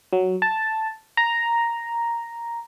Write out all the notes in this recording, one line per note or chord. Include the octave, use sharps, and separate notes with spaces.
F#3
A5
A#5